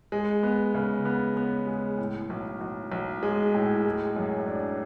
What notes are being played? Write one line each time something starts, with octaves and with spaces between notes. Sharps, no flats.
G#3
B3
C#3
B3
B3
G#3
A2
B1
B1
B1
G#3
A2
G#3
F#2
D4